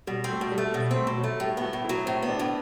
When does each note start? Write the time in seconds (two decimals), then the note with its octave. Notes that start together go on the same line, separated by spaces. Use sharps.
0.07 B2 G3
0.24 C4
0.29 A3
0.41 B2
0.52 G3
0.58 A3
0.74 B2 G3
0.91 A3 C4
1.07 B2
1.18 F#3
1.24 A3
1.40 A2 G3
1.57 B3 F#4
1.73 A2
1.84 F#3 E4
2.06 A2 C4
2.22 B3
2.28 D4
2.39 A2